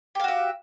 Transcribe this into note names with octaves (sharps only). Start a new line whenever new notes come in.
F#4 G4 E5 F5